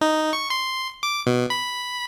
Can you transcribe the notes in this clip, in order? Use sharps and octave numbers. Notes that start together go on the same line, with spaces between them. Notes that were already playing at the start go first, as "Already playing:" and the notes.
D#4
C#6
C6
D6
B2
B5